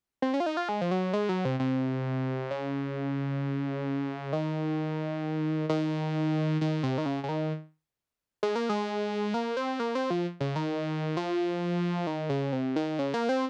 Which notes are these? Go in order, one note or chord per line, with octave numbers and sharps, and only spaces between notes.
C4
C#4
F4
D#4
F4
G#3
F3
F#3
G#3
F#3
C3
C3
C#3
D#3
D#3
D#3
C3
D#3
C#3
C#3
D#3
G#3
A#3
G#3
A#3
C4
A#3
C4
F3
C#3
D#3
F3
D#3
C#3
C3
D#3
C#3
A#3
C4